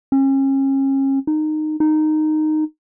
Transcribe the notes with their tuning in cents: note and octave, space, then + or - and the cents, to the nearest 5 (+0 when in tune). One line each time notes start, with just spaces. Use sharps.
C#4 -35
D#4 -15
D#4 -10